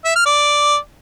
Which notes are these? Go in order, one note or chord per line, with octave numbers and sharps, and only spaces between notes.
E5
F6
D5